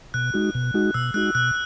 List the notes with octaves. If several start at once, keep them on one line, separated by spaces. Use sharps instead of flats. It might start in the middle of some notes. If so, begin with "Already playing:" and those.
B2 F#6
G#3 D#4 F#4
B2
G#3 D#4 F#4
B2 E6
G#3 D#4 F#4 F#6
B2 F#6